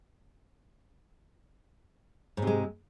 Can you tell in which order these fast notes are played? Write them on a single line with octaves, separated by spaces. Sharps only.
G#2 C3 G#3